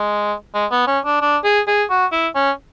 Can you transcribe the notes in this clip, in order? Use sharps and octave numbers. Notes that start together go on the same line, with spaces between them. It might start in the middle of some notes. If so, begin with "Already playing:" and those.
Already playing: G#3
G#3
B3
C#4
D4
D4
G#4
G#4
F#4
E4
C#4